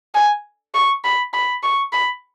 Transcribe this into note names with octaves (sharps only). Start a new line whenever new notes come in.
G#5
C#6
B5
B5
C#6
B5